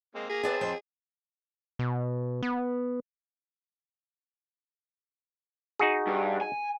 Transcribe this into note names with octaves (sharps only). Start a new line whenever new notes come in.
G#3 A#3 C4
A#3 G#4 A#5
C4 B4 D5 E5 A5
F2 C5 G5
B2
B3
D#4 F#4 G#4
G2
G#5